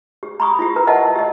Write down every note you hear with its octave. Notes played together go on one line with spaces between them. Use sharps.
G4
A#5 B5 C#6 D#6
E4 F4 G4
A#4 B4 A#5
A#4 D#5 E5 F#5 A5
G4 D#5